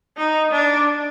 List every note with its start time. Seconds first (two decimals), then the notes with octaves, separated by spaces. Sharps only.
0.17 D#4
0.52 D4